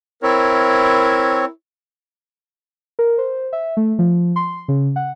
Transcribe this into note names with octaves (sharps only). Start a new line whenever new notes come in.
C4 E4 A#4 C#5
A#4
C5
E5
A3
F3
C6
C#3
F#5